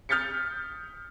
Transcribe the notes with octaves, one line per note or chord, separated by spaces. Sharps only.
D#6 F6 G6 A6 B6 C#7